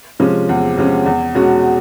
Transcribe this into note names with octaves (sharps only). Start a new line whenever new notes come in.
C3 F3 G#3 C#4
E2
C3 F3 G#3 C#4
E2
B2 G#3 C#4 F#4